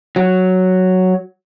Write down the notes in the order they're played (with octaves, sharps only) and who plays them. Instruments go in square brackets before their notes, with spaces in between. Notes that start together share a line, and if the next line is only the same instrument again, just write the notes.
[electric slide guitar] F#3